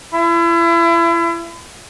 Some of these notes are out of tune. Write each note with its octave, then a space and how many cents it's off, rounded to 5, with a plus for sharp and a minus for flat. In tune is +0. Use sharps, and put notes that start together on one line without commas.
E4 +35